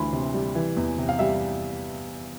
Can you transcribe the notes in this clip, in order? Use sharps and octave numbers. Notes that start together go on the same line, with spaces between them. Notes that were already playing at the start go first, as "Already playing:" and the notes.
Already playing: D2 E3 B5 C6
C3
G3
E3
E2
C3
F5
G3 E5